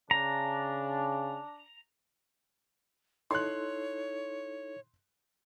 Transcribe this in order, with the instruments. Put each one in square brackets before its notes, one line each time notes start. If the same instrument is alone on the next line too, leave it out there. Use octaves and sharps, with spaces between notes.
[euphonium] C#3 [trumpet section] D4 [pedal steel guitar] A#5
[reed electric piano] D#4 E4 A4 [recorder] C#5 [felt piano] C6 F#6